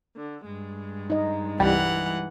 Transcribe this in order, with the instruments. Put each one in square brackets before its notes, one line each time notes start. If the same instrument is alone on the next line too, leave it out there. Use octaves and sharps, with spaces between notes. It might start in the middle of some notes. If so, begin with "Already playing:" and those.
[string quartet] D3
G2 G#3
[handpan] D#4 D#5
[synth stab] C2 G3 [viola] E3 F#5